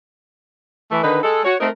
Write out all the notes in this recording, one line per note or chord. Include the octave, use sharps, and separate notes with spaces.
E3 A3
D3 D#3 D#4 B4
G#3 A4
F#4 C#5
A3 C4 D#4 A#4